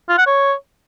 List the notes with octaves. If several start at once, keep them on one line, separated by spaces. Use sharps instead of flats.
F4
F#5
C#5